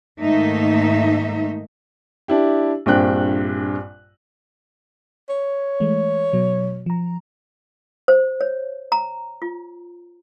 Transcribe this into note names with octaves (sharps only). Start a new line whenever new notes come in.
G#2 D#3 A3 A#3 D#4 E5
D4 E4 G4
A#1 G2 C4 G5 F#6
C#5
E3 G#3 A3
B2 F#3
F3 A#5
C5
C#5
A#5
F4